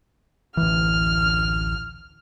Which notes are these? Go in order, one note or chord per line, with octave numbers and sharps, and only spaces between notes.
A1 D2 E3 F6